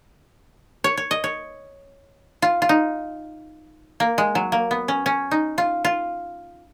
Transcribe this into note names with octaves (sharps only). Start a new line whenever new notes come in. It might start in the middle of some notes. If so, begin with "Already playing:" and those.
C#5
C#5
D#5
C#5
F4
F4
D#4
A#3
G#3
F#3
A#3
B3
C#4
C#4
D#4
F4
F4